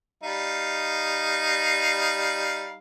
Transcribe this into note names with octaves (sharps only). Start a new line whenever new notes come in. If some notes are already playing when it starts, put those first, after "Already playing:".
G3 D#4 F5